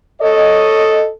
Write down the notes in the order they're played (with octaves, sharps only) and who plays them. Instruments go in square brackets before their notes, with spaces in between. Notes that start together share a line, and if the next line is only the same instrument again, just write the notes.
[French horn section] A4 C#5 D#5